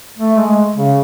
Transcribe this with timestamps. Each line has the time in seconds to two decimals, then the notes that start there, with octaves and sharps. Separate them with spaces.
0.18 A3
0.37 G#3
0.76 C#3